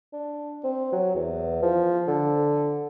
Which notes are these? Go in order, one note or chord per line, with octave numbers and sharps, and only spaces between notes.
D4
C4
F#3
E2
F3
D3